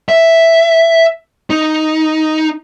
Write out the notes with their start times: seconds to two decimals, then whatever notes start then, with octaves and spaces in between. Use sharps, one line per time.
0.09 E5
1.50 D#4